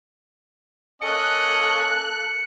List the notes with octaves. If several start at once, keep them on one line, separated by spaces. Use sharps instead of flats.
A#3 C#4 A4 D#5 F#6 C#7